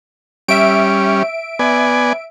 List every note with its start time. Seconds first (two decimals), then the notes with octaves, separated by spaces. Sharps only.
0.48 G3 C#4 E5 D7
1.59 B3 D5 G#5